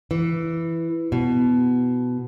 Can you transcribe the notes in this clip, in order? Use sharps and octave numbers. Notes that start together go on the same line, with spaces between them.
E3
B2